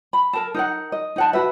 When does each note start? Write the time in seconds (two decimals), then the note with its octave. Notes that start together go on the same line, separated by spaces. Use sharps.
0.13 B5
0.33 A4 A#4 A5
0.54 D#4 A#4 F#5
0.92 D#5
1.16 D#4 F#5 A5
1.33 F#4 B4 E5